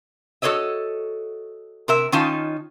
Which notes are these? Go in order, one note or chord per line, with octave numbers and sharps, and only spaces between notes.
F#4 A4 C5 C#5 D#5 E5
C3 A#4 E5
D#3 C#4 D#4 F4 A5